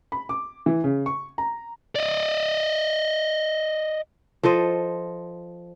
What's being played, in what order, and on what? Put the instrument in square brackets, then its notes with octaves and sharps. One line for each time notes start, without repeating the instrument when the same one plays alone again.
[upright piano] B5
D6
E3
C#3
C#6
A#5
[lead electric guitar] D5 D#5
[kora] F3 A4 C5 D#5